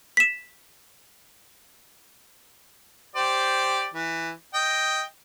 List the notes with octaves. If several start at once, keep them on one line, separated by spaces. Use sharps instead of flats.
B6 E7
G4 C5 D5
E3
D#5 G5